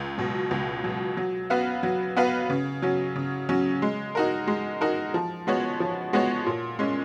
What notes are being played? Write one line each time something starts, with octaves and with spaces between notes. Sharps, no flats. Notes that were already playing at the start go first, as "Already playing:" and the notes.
Already playing: C#2
B2 F#3
C#2
B2 F#3
F#3
B3 F#4 B4 F5
F#3
B3 F#4 B4 F5
C#3
F#3 C#4
C#3
F#3 C#4
G#3
D#4 F#4 A#4
G#3
D#4 F#4 A#4
F3
G#3 B3 F#4 C#5
F3
G#3 B3 F#4 C#5
A#2
G#3 C#4